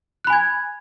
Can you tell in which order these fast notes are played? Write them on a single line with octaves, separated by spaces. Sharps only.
F#6 B5 G#5 G#6